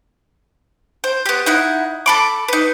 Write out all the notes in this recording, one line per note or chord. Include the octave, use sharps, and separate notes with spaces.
C5
B3 G4
D#4 E4 F#5
A4 B5 D6
D#4 B4